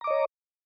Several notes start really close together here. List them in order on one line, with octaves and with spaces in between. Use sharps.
A#5 D6 D#5 C#5